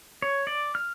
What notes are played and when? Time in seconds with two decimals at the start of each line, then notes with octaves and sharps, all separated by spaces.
0.22 C#5
0.47 D5
0.75 F6